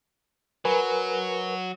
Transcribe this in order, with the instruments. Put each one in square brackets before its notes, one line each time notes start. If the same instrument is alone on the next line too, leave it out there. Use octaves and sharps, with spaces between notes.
[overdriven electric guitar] F#3 [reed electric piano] A#4 B4 G#5